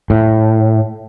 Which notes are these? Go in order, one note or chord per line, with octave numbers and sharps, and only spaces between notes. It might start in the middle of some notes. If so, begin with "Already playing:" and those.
A2